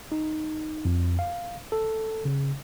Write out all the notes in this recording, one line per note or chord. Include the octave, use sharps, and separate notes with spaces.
D#4
F2
F5
A4
C#3